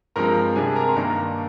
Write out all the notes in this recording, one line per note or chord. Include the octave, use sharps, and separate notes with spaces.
G2 F3 G#3 C4 A#4 A#5
C3 G3 D4 G#4 G#5
A#4 A#5
C6
G2 D#3 A#3 D4 A#4 A#5